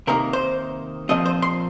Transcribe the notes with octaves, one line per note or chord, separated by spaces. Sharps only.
C3 D#3 A#3 A#4
C5
A#2 F3 C4 D#5
C5
C6